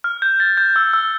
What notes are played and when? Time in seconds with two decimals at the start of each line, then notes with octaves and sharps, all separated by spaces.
0.04 F6
0.22 G6
0.40 A6
0.57 G6
0.76 E6
0.93 E6